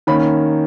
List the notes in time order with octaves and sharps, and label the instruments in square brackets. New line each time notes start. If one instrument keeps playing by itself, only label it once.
[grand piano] D#3 A#3 C#4 B5